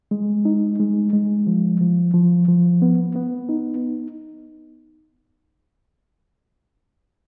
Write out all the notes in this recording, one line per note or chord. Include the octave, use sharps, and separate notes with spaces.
G#3
D#4
G#3
G#3
F3
F3
F3
F3
B3
B3
D#4